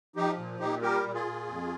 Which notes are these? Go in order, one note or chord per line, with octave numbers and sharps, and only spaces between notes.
F3 D#4 G4
A#2
A#2 D#4 G4
G3 G4 A#4
A#2
F4 G#4
A#2
F2